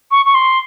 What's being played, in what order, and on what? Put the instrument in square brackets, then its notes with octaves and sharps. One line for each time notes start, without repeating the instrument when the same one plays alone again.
[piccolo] C#6
C#6
C6